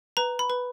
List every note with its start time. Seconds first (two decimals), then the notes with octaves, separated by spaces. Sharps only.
0.17 B4 A#5
0.39 B5
0.50 B4